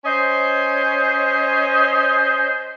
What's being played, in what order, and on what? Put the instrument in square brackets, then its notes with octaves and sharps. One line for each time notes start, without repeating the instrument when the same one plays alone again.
[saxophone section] C#4 C5 D#5